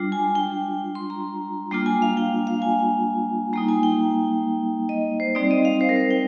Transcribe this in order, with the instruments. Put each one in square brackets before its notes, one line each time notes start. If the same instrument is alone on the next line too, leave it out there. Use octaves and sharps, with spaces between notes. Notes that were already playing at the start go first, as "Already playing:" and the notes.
Already playing: [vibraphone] G3 D4 F4
G#5
G5
C6
A#5
G3 A#3 D4 F4 G5
G#5
F5
G5
F5
G#5
G3 A#3 D#4 A#5
G#5
G5
D#5
C5
G3 C4 D#4 D5
D#5
F5
C5
A#4
C5
G5